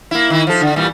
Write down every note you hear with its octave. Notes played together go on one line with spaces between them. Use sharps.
A#3 E4
D#3 E4
F3 A4
D3
A#2 E3 G3